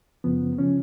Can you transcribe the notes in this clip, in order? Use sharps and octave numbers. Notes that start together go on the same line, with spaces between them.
F#2 C#3 F3 B3
C#3 F3 C#4